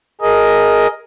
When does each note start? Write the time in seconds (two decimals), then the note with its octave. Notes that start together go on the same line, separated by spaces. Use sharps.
0.21 G#4 A#4 D#5